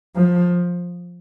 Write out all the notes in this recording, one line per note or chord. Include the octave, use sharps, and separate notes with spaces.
F3